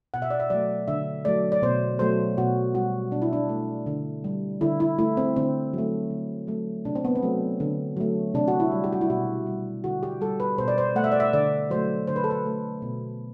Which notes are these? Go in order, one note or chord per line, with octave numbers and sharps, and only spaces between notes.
B2 F#5
E5
D5
E5
F#3 A3 D5
D3 E5
F#3 A3 D5
D5
B2 C5
F#3 A3 C5
B2 F#4
G3 F#4
B2 D4
E4
D4
A3
D3
G3
D3 E4
E4
A3 E4
C4
D3 C4
F#3 A3
D3
F#3 A3
C3 D4
C4
B3
C4
F#3 A3
D3
F#3 A3
C3 D4
F#4
E4
G3
G4
F#4
E4
B2 F#4
G3
D3 F#4
G4
G3 A4
B4
B2 C5
D5
C5
A3 F#5
E5
D5
E5
D3 D5
F#3 A3 C5
D3 C5
B4
A4
B4
A3
B2